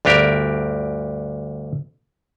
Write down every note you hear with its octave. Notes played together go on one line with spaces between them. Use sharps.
D2 G2 D4 G4 A#4